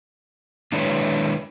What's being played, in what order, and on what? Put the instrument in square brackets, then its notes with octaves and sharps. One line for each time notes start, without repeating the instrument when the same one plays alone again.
[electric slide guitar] D#3 G#3 D4 E4 B4 C#5